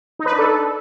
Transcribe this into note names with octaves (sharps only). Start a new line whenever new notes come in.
D#4
B4
D4
A4